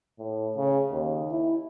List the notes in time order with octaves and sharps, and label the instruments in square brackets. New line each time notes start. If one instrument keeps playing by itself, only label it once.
[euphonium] A2
C#3
D#2
E4